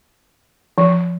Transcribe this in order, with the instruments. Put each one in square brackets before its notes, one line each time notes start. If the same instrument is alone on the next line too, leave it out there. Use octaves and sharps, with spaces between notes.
[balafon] F3